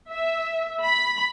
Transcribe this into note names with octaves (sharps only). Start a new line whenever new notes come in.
E5
B5